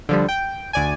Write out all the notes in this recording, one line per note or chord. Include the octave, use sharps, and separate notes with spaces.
D3 F3 G3
G5
D2 D5 G#5